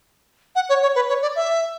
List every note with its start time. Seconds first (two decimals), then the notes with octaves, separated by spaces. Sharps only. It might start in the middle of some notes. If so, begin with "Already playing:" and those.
0.55 F#5
0.69 C#5
0.82 C#5
0.95 B4
1.09 C#5
1.22 D5
1.36 E5